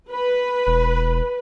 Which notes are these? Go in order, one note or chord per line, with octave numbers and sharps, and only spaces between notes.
B4
E1